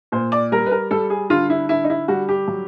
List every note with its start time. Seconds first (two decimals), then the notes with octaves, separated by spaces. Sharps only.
0.12 A#2 C5
0.32 D5
0.52 G3 A#4
0.66 B4
0.71 A#4
0.91 G3 A4
1.10 G#4
1.30 D3 F4
1.50 E4
1.69 D3 E4
1.84 D#4
1.90 E4
2.08 G3 F#4
2.29 G4
2.47 F#3